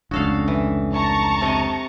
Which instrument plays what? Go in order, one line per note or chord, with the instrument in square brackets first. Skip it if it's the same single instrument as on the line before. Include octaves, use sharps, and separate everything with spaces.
[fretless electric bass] F1 C#2 [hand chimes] C#4 D4 [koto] F#4 A4 F5
[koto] E3
[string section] A5 A#5 C#6
[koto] C3 D#5